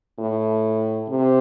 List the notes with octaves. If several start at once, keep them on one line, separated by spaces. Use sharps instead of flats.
A2
C3